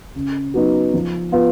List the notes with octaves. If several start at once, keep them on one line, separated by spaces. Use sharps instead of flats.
C#3
F#3 B3 D#4
F3
B3 F4